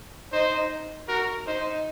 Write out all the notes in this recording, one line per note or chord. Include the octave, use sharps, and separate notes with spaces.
D#4 C5
F#4 A#4
D#4 C5